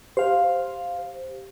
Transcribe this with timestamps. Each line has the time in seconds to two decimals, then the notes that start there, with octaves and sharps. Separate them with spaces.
0.17 G4 C5 F5